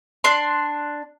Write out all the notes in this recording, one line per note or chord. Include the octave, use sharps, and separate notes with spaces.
D4 C6